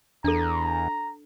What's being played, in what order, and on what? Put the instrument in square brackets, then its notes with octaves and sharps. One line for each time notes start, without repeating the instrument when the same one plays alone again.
[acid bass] E2 [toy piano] D4 A4 [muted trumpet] A#5